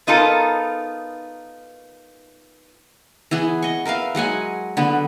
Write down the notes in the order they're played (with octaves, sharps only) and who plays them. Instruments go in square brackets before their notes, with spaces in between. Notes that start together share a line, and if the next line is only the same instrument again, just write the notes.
[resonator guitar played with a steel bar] B3 D#4 F4 A4 A#4
[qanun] E3 B3 G#4
D#5 C#6
A#4 B4 E5 F5
F#3 G#3 F#5 G#5
D3 B3